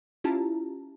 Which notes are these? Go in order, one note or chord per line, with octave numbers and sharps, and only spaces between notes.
C#4 E4 F4 G4 A5 A#5